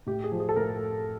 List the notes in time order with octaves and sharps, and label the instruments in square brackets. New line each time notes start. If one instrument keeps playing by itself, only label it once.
[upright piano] A2 G4
G#4
F3
G#4
A4
A2 A#4